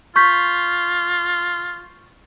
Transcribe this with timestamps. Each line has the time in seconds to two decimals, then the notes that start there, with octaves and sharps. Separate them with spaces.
0.16 F4 C#6 G6 B6